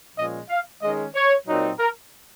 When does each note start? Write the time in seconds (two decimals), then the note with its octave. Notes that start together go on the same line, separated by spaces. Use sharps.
0.17 A#2 F3 G#3 C#4 D#5
0.50 F5
0.82 D#3 G#3 C#4 D#5
1.15 C#5
1.47 A#2 F#3 C4 D#4
1.79 A#4